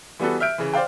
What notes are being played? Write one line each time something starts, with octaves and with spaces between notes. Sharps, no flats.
E3 G3 B3 F#4 A4
E5 F6 G6 D7
C#3 E3
C5 D5 F5 G5